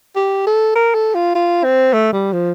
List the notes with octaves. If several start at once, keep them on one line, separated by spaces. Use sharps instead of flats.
G4
A4
A#4
A4
F4
F4
C4
A3
G3
F3